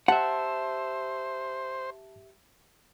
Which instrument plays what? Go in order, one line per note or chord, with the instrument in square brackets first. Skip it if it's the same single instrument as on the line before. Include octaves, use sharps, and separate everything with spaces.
[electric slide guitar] G4 E5 [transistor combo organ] C5 [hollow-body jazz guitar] F#5 [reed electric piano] A5